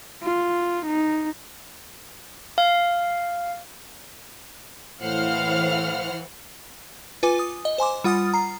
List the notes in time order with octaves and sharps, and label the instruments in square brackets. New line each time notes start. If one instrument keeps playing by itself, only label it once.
[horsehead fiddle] F4
D#4
[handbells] F5
[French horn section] A2 [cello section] E3 [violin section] C5 F#5 F6 [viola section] F5
[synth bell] F4 B4 G#5 D6
D#6
D#5
C5 G#5 C6 D6
G3 F4 F#5 D#6 F6 A6
A#5 C7